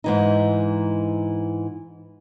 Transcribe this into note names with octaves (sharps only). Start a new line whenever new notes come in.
G#2 E3 D#4